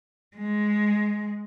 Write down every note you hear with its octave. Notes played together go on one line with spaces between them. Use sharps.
G#3